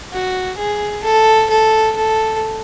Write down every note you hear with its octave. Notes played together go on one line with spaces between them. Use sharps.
F#4
G#4
A4
A4
A4